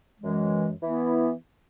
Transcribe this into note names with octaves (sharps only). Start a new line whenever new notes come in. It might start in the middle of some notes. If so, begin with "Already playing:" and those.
F#2 E3 G#3
E3 B3 E4